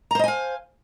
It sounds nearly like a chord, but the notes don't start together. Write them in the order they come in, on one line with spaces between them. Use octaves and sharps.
A#5 C5 D#5 G#5 F5